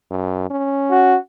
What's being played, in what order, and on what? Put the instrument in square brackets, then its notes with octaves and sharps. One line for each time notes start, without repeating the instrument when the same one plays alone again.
[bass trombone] F#2
C#4
[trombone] F#4